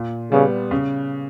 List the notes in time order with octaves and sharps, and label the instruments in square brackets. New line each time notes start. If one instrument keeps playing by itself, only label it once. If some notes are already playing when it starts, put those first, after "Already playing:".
Already playing: [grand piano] A#2
[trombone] C#3 [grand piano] G3 B3
[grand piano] C#3